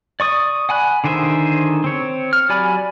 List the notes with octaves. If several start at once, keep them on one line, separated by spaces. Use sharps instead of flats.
D5 C#6 D#6
F#5 G#5 B5 F#6
D3 D#3 G#4 C5 E5
C4 C#5
F6
F#3 G4 D5 G#5 B5